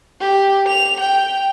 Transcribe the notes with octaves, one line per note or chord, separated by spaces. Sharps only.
G4
F7
G5